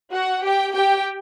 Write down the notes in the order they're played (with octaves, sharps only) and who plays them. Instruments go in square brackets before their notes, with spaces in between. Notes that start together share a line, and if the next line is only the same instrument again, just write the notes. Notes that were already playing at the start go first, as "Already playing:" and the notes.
[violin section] F#4 F#5
G4 G5
G4 G5